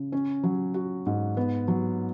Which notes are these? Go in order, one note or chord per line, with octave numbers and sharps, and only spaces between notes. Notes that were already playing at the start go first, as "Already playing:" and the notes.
Already playing: C#3
C#4
F#3
F#4
G#2
B3
F#3